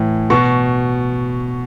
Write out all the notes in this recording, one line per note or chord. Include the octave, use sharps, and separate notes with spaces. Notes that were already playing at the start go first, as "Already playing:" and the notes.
Already playing: A2 E3
B2 C#6